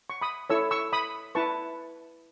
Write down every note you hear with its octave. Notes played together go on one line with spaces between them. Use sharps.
C#6
B5 D#6
E4 A4 C#5 C#6 E6
C#6 E6
B5 D#6
E4 B4 A5 C#6